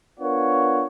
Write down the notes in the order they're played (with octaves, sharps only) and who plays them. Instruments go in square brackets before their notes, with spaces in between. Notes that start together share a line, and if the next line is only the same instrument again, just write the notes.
[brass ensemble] B3 D4 F4 A#4 C#5 F#5